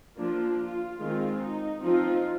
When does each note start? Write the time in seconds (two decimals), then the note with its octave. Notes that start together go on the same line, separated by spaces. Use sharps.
0.17 F3 A#3 D4 F4
0.58 F4
0.99 D#3 G#3 C4 F4
1.40 D#4
1.81 F3 C4 D#4 F4